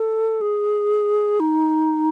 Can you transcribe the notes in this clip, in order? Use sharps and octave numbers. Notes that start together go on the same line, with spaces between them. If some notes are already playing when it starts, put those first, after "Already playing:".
Already playing: A4
G#4
D#4